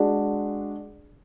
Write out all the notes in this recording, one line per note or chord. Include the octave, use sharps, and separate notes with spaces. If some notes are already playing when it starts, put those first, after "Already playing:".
Already playing: G#3 D4 F#4